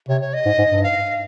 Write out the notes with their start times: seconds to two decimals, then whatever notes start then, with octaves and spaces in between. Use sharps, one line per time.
0.08 C3 C#5
0.21 C#5
0.33 D#5
0.46 G#2
0.59 G#2
0.70 G2
0.83 F5